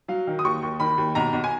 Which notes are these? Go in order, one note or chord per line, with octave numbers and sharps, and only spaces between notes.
F#3 F5
D#3
D#6
D#2 C#6
D#2
D#3 B5
D#2
B1 A#5
B1
G#5